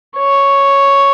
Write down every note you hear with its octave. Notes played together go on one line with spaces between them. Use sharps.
C#5